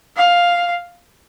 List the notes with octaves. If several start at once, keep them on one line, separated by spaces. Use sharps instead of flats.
F5